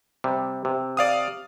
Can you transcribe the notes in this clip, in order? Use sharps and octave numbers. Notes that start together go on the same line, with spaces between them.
C3 G3
C3
D5 F5 D#6